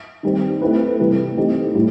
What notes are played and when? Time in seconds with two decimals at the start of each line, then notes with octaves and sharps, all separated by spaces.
0.23 D#3 G3 C4
0.62 A3 C4 E4 B4
1.00 C3 E3 G3
1.37 E3 A3 C4 D#4 G4
1.75 A2 G3